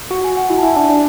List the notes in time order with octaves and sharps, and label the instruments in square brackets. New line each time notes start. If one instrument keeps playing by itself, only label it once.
[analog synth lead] F#4 [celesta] F#5
[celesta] G#5
F#5
[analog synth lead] E4 [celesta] F#5
[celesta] A5
[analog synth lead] E4 [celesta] G#5
[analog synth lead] D4 [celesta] A5
[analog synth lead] D4